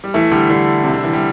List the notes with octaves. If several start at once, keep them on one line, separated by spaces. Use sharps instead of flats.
G3
E3 A3
D3 G3
D3 G3
C3
D3
E3
G3